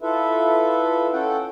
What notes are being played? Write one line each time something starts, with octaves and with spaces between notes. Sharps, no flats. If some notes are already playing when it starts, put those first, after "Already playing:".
E4 F4 A4 B4 E5
C#4 A4 F#5 G5